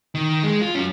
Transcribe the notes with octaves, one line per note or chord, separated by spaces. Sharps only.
D#3
G#3
F4
F#3 C#4